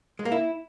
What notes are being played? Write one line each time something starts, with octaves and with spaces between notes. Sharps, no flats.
G#3
A#3
E4